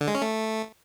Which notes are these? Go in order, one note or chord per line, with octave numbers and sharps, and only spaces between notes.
D3
G#3
C#4
A3